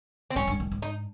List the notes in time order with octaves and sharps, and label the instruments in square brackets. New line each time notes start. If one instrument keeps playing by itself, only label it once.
[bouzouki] C4
[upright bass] G#2 [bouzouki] C#4
[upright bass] G2
G#2
G#2
[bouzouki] D#4